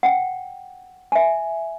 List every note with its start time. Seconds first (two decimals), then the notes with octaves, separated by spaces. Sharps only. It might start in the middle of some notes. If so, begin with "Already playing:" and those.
0.03 F#5 G5
1.12 E5 G#5